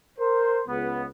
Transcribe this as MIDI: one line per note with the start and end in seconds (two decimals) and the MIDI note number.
0.18 0.60 70
0.18 0.60 72
0.68 1.06 37
0.68 1.06 59